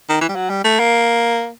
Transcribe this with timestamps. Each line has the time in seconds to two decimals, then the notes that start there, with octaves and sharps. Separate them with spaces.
0.09 D#3
0.21 E3
0.29 G3
0.36 F#3
0.50 G3
0.65 A3
0.80 A#3